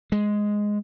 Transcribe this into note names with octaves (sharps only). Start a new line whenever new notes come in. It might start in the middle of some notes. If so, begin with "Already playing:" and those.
G#3